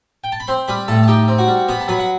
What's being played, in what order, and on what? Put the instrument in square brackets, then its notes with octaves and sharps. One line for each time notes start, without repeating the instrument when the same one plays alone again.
[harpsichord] G5
A5
B5
C4 C5 C6
G3 B4 B5
A2 A4 A5
A5
D#4 G4 G5
C4
F#4 F#5
G3
B3 B4 B5
A5
F#3 B4 B5
F#5